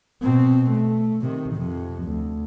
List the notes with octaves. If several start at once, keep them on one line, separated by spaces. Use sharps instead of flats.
B2 C4
A3
C3 D#3
F2 C3
D2